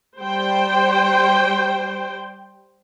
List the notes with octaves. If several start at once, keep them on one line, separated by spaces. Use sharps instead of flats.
G3 C5 G5